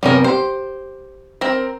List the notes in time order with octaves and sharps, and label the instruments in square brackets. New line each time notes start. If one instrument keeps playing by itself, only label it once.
[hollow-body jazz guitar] F#2 C3 B3 [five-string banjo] G3 C#4 A#4
[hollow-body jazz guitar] G4 [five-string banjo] C5
[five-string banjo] C4 A#4